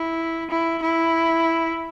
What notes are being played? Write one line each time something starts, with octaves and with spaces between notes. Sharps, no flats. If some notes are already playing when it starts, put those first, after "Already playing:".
Already playing: E4
E4
E4